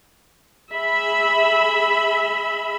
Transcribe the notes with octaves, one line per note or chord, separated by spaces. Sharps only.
G#4 E5 B5